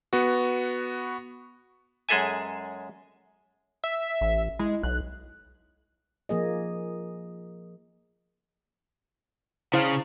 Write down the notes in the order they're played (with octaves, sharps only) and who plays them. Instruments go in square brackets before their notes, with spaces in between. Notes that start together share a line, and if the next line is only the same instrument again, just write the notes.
[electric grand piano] B3 F#4
[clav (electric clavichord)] F#2 G#3 G#4 A4 E5 G#5
[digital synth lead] E5
[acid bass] A1
[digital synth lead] G#3 [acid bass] E4
[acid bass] B1 [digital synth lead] F#6
[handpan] F3 A#3 G#4 D#5
[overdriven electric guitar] C#3 [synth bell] E4 [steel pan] C5 F5